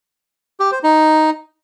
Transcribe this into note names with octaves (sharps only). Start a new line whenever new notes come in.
G4
C5
D#4